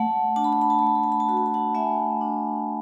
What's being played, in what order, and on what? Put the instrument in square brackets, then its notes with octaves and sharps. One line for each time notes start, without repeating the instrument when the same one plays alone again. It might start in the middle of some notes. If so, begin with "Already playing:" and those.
Already playing: [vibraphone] A3 F#5 A5
D4 A5
B5
A5
B5
A5
B5
A3 A5
B5
A5
B5
A5
F#4 B5
A5
B5
F#5 A5
A3 E5 G#5
D4